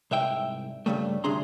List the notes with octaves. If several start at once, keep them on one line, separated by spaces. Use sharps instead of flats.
C2 G#2 E5 G5
G2 A#2 C#3 G3 A3
D2 C3 D4 G#4 A#5 C6